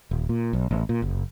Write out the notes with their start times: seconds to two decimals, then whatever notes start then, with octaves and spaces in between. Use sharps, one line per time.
0.11 D#1
0.29 A#2
0.53 B1
0.71 A1
0.89 A#2
1.02 F#1